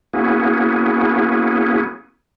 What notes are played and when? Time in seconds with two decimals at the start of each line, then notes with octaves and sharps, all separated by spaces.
0.13 A#3 B3 C#4 E4 F#4 G#4